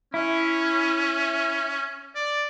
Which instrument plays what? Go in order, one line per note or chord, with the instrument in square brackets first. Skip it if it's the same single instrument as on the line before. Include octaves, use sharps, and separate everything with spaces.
[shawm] C#4 [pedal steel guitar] E4
[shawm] D5